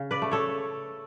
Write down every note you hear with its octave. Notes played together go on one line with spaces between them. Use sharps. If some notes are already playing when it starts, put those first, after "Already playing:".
Already playing: C#3
B4 D5
A3
A4 C#5